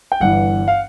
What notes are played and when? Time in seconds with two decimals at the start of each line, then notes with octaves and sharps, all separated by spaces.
0.12 G5
0.20 G1 G2 E3 F#5
0.68 F5